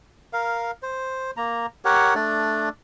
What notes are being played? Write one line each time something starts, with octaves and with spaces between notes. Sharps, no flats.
A#4 F5
C5
A#3 A#5
G4 A#4 C#5 F#5
A3 D4 D5